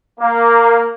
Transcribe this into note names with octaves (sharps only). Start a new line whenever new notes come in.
A#3